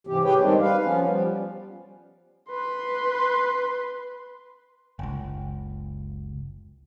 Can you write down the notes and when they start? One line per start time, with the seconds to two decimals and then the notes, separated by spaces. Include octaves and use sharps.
0.07 G#2 C3 E3 G4
0.24 G4 G#4 B4 C#5 G5
0.40 G#2 D#3 G3 G#3 C4 D4
0.61 B4 F5
0.85 F3 B3 C#4
1.08 F3 G3
2.51 B4 C6
4.99 F#1 C#2